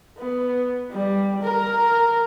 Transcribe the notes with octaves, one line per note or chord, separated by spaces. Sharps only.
B3
G3
A#4